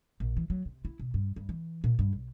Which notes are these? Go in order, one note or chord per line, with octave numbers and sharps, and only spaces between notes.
A#1
E3
F#3
C3
E4
B2
G2
G2
E3
A#2
G2
B1